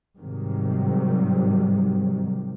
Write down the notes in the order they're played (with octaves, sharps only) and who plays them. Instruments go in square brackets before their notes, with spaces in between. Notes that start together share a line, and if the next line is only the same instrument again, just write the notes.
[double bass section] G#2 C3 D#3 F#3 G3